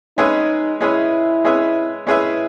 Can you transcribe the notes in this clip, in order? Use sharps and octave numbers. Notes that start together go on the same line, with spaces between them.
G#3 C#4 D#4 G#4 B4 E5
G#3 C#4 E4 G#4 B4 E5
G#3 C#4 G#4 B4 E5
G#3 C#4 E4 G#4 B4 E5